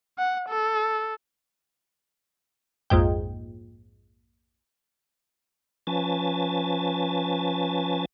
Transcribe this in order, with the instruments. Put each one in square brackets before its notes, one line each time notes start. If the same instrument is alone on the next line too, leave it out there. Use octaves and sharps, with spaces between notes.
[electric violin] F#5
A4
[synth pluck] A#1 F2 G#2 G5
[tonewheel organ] F3 C#4 B4 G#5 A5 A6